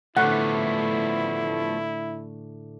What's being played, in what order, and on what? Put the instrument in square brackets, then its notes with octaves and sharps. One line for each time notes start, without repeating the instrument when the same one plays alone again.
[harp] A2 D3 [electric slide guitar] F3 A3 B3 [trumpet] E4 [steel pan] F#5